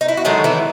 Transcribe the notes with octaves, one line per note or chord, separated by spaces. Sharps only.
D#4
E4
F#4
D#3 F#3 G#3 A3 G#4
E3 E4